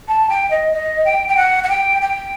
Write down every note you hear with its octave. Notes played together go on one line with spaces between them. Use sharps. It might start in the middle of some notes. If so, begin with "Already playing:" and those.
A5
G5
D#5
D#5
G5
G5
F#5
F#5
G5
G5